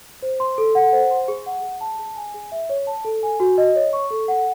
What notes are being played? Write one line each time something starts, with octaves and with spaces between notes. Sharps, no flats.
C5
C6
A4
F#5
C5
C6
G#4
F#5
G#4
A5
G#4
G#5
G#4
E5
C#5
A5
A4
G#5
F#4
D#5
C#5
C#6
A4
F#5